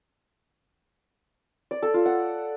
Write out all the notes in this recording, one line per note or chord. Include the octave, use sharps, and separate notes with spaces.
D5
A4
F4
F#5